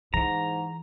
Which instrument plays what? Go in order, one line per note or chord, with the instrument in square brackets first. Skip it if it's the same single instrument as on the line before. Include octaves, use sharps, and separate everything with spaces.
[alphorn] G#2 [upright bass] E3 [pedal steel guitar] A#5